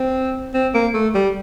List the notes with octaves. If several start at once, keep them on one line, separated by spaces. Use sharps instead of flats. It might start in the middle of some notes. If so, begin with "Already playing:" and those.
Already playing: C4
C4
A#3
A3
G3